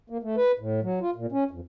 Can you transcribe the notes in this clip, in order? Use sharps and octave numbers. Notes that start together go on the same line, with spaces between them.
A#3
A3
B4
A2
F#3
F4
A#2
C#4
F2